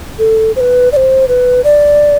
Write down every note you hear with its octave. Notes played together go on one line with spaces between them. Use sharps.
A4
C5
B4
D5
C5
B4
D5